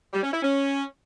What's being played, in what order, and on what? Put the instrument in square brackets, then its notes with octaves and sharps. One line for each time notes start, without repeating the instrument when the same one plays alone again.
[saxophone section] G3
C#4
E4
C#4